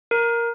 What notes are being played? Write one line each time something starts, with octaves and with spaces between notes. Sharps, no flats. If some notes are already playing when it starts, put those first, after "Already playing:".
A#4